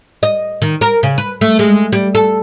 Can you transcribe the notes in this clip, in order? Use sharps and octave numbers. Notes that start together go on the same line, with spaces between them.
D#5
D#3
A#4
C#3
B4
A3
G#3
G3
A4